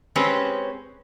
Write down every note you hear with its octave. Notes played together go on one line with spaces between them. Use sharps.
G#3 C4 C#4 G4 B4